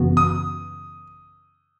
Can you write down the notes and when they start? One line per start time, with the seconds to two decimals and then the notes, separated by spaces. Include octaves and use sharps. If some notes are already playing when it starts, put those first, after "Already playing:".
Already playing: F#2 C#3 E3 B3 F#4
0.17 D#6